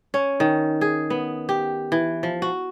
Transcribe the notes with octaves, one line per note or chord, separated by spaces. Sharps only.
C#4
D#3
G#4
B3
G4
E3
F3
F#4